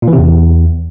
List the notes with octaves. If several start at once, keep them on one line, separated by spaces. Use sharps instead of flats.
A#2
E3
C3
E2